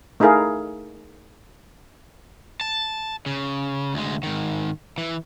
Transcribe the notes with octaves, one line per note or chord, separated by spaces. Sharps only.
A3 D#4 E4 G#4 A#4 F5
A5
C#3
D2 G#3
G#2 D#3
E3